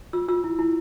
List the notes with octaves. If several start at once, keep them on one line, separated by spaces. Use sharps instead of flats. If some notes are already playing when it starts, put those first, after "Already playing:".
F4 E6
F4 E6
E4
E4